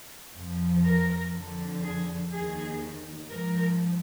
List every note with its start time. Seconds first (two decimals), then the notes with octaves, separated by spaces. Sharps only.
0.35 F2 F3
0.84 A#4
1.33 F2 D3 F3
1.82 G#4
2.32 D#2 D#3 G#4
3.30 G#2 F3 A#4